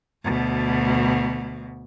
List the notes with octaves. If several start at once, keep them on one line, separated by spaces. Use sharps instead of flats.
D2 B2